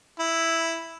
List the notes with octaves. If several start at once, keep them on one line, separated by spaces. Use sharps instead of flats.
E4